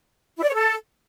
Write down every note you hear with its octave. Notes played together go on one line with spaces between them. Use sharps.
E4
D5
C#5
A4